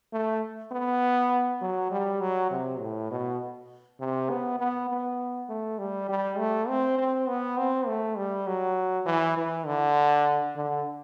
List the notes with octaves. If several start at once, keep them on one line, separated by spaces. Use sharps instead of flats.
A3
B3
F#3
G3
F#3
C3
A2
B2
C3
B3
B3
B3
A3
G3
G3
A3
C4
C4
B3
C4
A3
G3
F#3
E3
E3
D3
D3